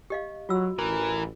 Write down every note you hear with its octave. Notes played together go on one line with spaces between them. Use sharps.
G4 D#5 F5
F#3 F4 F#4 E6
A1 E3 A#4